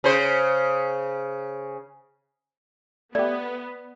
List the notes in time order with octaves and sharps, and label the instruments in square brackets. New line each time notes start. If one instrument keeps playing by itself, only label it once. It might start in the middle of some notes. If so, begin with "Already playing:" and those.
[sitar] C#3 C5
[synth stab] A3 G4 [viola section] B3 [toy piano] D5